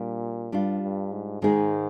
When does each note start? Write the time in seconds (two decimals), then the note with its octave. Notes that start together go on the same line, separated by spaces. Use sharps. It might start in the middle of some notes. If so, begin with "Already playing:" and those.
Already playing: A#2 G3 D4 F4
0.52 G2 G3 D4 F4
0.82 G2
1.12 G#2
1.42 G#2 D#3 G#3 D#4 G#4